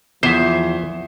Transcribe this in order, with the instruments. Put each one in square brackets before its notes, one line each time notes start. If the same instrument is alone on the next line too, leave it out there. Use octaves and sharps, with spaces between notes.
[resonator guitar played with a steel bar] E2 [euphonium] F3 [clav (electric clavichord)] C5 E5